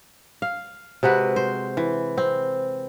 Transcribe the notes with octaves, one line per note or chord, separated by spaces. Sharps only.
F5
C3 G#3 F#4 B4
C5
E3
C4